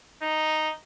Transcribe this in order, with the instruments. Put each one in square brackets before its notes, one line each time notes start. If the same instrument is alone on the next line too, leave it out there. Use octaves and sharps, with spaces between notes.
[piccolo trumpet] D#4